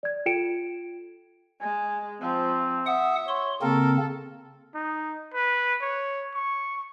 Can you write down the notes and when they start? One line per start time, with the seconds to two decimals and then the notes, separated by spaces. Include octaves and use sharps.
0.03 D5 G#6
0.26 F4 A4 G5 C#7 D7 E7
1.61 G#3 G#5
2.22 F3 C4
2.86 E5 F#5 D#6
3.28 C#5 C6
3.62 C#3 A#3 C4 A4 A#4
4.74 D#4
5.34 B4
5.81 C#5
6.34 C#6